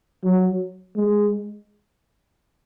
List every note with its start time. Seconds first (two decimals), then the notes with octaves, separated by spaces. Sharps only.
0.24 F#3
0.96 G#3